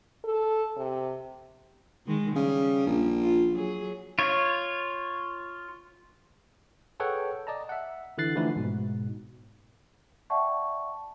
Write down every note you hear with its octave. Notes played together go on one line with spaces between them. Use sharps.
A4
C3
D#3 G#3
C#3 G3
A#1
F4
F#3 G#4
F4 C#5
G#4 A4 B4 C#5 F#5 G5
D5 D#5 A5 A#5
E5 F#5
D3 E3 E4 F#6 A6 C7
D3 E3 F3 A3 D#4 B4
G#2 B2
D5 E5 F#5 G5 A5 C#6